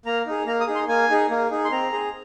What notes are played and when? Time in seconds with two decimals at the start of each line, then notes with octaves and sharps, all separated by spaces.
0.06 A#3 A#5
0.26 D#4 G#4
0.47 A#3 A#5
0.60 D#6
0.67 D#4 G#4
0.75 C6
0.88 A#3 G#5
1.10 D#4 G#4
1.31 A#3
1.51 D#4 G#4
1.64 C6
1.71 C4 A#5
1.92 G#4